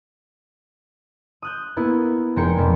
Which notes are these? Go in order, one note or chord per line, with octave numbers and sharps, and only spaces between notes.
D#6 F#6 G6
A#3 B3 E4
F1 G#3 A#4 G5 C#7
F2 B2 B3